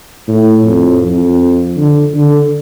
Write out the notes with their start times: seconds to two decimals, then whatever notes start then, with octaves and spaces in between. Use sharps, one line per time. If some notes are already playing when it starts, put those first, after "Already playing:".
0.28 A2
0.65 F2
1.03 F2
1.77 D3
2.14 D3